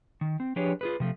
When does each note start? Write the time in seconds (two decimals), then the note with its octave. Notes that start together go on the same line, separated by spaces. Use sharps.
0.21 D#3
0.40 C4
0.56 F3 D4 G4 G#4 B4 C#5
0.81 F4 G#4 B4
1.00 C3 F3 A3